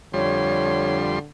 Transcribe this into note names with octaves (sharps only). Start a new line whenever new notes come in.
F2 D3 G3 C#5 C6